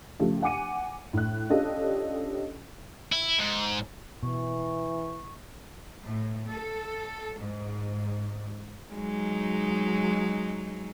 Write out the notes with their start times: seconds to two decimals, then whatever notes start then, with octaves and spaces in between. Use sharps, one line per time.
0.19 C#3 F3 A3 G4
0.42 F#5 G#5 D6 C#7 D#7
1.13 A2 F#6
1.50 C#4 D4 F4 G4 A4 D#5
3.12 E4
3.39 G#2
4.23 B2 E3 C#6
6.05 A2
6.50 A4
7.39 G#2
8.92 F#3 G#3 D#4